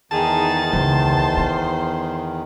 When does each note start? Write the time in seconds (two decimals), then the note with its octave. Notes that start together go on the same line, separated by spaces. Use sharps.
0.11 E2 D#3 D#4 G#4 A5
0.73 C#2 C5
1.37 B3